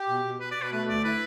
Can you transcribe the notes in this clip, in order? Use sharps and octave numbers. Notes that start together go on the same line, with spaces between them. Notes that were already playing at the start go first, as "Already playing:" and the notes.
Already playing: G4
B2
B2
B2 B4
D5
B2
B4
A3 B4
D2 D5
E4 B4